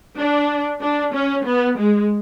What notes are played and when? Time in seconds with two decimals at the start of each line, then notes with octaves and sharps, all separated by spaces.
0.17 D4
0.81 D4
1.13 C#4
1.45 B3
1.78 G#3